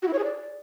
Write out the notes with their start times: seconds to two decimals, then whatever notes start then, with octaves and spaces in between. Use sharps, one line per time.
0.02 F#4
0.08 E4
0.13 C#5
0.19 G#4
0.24 D5